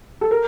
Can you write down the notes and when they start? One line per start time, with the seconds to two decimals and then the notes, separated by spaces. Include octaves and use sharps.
0.21 A4
0.31 A#4